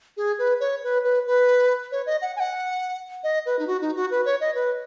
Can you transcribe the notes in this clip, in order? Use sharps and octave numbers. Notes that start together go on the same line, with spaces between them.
G#4
B4
C#5
B4
B4
B4
C#5
D#5
F#5
G#5
F#5
D#5
B4
D#4
F#4
D#4
F#4
B4
C#5
D#5
B4